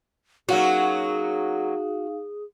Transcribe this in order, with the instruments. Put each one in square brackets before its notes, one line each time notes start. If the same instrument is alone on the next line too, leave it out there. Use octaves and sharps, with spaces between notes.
[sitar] F#3 A#3 C#4 [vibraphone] D#4 F5 [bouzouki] F#4 [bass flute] G#4